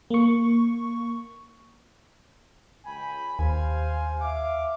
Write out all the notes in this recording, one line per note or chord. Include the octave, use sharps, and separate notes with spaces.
A#3 C#6
C#2 G5 G#5 B5
D#2 G4 C5 F5 G#5
E5 F5 D6